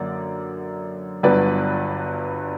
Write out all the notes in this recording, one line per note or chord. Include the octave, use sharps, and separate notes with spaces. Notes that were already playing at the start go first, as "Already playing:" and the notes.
Already playing: F#2 D3 A#3 D5
G1 G2 F#3 B3 B4 D5